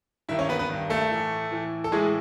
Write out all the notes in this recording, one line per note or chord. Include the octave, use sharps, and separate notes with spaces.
G2 D#3 E4 E5
C#4 C#5
B3 B4
B3 B4
G2 D#3
A3 A4
A2 E3
A2 E3
A4
A2 E3 G#3 G#4